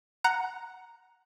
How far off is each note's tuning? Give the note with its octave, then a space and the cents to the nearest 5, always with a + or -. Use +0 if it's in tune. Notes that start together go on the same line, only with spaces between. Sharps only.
F#5 +5 A#5 +0